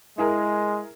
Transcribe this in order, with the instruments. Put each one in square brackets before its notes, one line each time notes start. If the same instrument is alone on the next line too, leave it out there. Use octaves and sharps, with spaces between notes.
[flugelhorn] G#3 [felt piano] E4 G#4 A#4